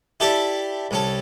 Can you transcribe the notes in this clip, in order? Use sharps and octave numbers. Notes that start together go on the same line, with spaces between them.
E4 G4 A4 D5 E5
C2 C#4 A4